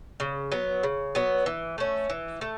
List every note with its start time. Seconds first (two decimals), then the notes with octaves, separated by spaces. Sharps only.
0.20 C#3
0.52 F#3 B3
0.83 C#3
1.15 F#3 B3
1.46 E3
1.78 A3 C#4
2.10 E3
2.41 A3